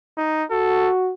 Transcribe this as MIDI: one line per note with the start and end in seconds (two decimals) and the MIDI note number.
0.17 0.44 63
0.51 1.12 66
0.51 0.91 69